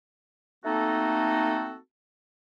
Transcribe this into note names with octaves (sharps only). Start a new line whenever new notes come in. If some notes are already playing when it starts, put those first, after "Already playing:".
A3 A#3 C4 D#4 F#4 A4